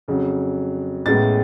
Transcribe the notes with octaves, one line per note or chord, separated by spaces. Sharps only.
F2 C#3 F#3
A1 A2 G#3 B3 A6